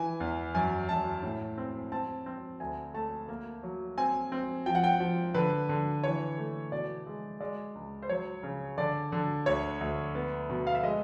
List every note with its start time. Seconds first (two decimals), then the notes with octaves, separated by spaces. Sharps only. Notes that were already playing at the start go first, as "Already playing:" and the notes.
Already playing: E3 G#5
0.20 E2
0.55 F#2 G#5
0.89 F#2 A5
1.23 A2
1.58 C4
1.92 C4 A5
2.26 C4
2.60 D2 G#5
2.94 A3 A5
3.29 A#3
3.63 F#3
3.98 C4 G#5
4.32 C4
4.66 F3 G5
4.75 F#5
4.84 G5
5.00 F3
5.34 D3 B4
5.69 D3
6.04 E3 C#5
6.38 A3
6.72 B2 D5
7.06 G#3
7.40 G#3 D5
7.75 C#2
8.02 C5
8.09 F#3 C#5
8.43 C#3
8.78 D3 D5
9.12 D3
9.46 D2 C#5
9.81 D2
10.15 B3
10.50 B2
10.67 F5
10.75 E5
10.83 G#3 D#5